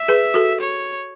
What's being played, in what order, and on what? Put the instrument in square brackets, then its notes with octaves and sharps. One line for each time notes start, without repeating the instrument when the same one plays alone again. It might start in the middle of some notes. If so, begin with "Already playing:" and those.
Already playing: [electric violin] E5
[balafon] G#4 B4
F#4 A4
[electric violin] C#5